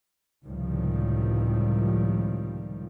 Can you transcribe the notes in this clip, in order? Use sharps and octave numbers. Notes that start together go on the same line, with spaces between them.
C#2 A2 C3 D#3 F3 G3